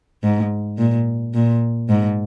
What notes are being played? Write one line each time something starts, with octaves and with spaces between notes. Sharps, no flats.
G#2
A#2
A#2
G#2